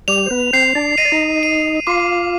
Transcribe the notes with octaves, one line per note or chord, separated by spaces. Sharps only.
G3 G4 F7
C5
B3 B4
C4 C5 C7
D4 D5
D#5 D#7
D5
D#4 D#5
D#7
F4 F5 D6